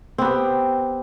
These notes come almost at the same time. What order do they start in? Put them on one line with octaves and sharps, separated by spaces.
C4 B3 G4